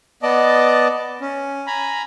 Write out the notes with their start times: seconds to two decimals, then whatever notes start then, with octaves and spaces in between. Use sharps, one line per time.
0.23 B3 D5 D#5 A5
1.21 C#4
1.67 G#5 A#5 B5